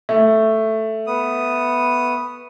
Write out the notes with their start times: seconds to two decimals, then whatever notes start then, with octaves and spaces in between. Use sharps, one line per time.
0.09 A3
1.07 B3 D#6